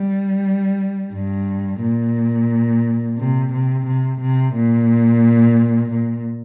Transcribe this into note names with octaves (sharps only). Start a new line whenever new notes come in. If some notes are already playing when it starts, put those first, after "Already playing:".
Already playing: G3
G2
A#2
C3
C3
C3
C3
A#2
A#2